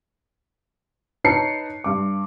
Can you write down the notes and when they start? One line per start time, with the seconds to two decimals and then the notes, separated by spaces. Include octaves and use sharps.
1.24 D#4 B4 C#5 A5 C7 C#7
1.84 G2 D6